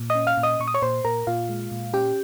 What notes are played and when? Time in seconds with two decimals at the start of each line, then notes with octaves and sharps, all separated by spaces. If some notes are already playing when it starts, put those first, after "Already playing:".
Already playing: A#2
0.10 D#5 D#6
0.15 C#4
0.27 F5 F6
0.38 A#2
0.43 D#5 D#6
0.60 A#2 C#6
0.68 D#6
0.74 C#5 C#6
0.82 A#2 C5 C6
1.05 A#2 A#4 A#5
1.27 A#2 F4 F5
1.49 G#3
1.72 A#2
1.93 C#4 G4 G5